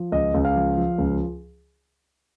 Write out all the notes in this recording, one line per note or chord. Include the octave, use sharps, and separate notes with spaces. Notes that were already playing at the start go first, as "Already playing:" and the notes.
Already playing: F3
C#2 D#5
C#2
F5
F3
F3
C#2